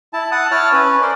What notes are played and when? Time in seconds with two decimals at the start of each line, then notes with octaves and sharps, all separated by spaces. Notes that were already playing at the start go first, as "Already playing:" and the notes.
0.13 E4 A5
0.32 F#5 A5 D#6
0.51 E4 C#5 A5 F6
0.72 C#4 B4
1.02 A#4 C5 D5